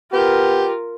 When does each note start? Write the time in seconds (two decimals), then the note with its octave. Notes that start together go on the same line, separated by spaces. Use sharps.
0.13 B3 F4 G4 A#4